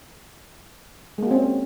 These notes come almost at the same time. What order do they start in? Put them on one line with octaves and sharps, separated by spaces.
G#3 A#3 F#4 C4 C#4